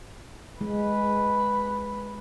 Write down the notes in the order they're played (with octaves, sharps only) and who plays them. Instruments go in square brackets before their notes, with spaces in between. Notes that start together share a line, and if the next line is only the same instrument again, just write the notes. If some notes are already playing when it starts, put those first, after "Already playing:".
[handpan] G#3 [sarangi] B4